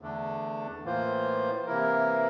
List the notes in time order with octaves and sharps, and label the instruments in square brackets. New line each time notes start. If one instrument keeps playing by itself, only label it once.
[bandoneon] E2 D3 A3 D4
A2 E3 A#3 F4 C5
C3 E3 A#3 E4 A#4